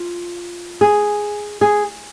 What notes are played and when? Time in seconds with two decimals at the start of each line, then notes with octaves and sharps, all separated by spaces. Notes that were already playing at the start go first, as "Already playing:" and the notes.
Already playing: F4
0.81 G#4
1.61 G#4